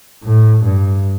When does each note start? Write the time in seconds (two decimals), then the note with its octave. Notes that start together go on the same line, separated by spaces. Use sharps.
0.24 A2
0.64 G2